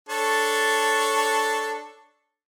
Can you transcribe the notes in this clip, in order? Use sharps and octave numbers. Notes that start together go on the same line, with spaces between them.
D4 A4 C#5